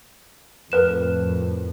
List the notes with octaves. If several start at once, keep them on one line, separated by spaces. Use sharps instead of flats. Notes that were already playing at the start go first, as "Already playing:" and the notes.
F2 A2 A#4 B4 E7